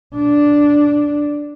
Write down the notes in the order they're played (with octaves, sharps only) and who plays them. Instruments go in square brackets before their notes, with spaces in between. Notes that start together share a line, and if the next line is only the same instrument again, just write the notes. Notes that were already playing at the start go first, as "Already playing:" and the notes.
[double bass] D4